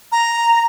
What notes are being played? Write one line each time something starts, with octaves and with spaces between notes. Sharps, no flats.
A#5